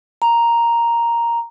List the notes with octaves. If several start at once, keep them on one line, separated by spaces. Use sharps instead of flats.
A#5